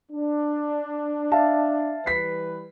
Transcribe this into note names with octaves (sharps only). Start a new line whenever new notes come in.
D4
E5 F5 A5
E3 G3 B4 B6 C7